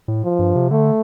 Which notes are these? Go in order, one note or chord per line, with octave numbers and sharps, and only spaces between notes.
A2
F3
G2
C3
D3 A3